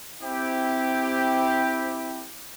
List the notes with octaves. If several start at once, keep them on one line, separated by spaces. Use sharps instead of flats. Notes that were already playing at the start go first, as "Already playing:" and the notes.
C4 E4 G4